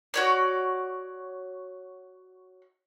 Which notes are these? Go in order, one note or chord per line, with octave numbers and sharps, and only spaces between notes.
F#4 C#5 D5